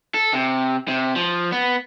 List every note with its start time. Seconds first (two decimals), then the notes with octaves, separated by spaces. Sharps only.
0.14 A4
0.33 C3
0.88 C3
1.16 F3
1.52 B3